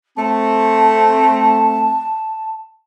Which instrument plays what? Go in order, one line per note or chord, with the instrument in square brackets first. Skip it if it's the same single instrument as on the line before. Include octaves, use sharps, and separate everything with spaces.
[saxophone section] A3 C4 [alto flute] A5